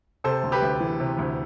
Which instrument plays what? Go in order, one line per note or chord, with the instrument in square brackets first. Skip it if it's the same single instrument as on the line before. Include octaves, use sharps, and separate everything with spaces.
[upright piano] C3 A4 C5
D2
G4 B4
D2
E3
C3
D2